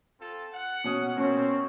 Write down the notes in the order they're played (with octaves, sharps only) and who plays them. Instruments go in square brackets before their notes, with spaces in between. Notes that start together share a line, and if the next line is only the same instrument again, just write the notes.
[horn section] C4 F4 A4
F#5
[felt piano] B2 C#4 D#6
[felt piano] B2 [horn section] A#3 C4 [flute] C#4